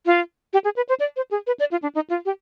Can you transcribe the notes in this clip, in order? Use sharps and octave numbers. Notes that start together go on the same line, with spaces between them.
F4
G4
G#4
B4
C5
D5
C5
G#4
B4
D5
F4
D4
D#4
F4
G4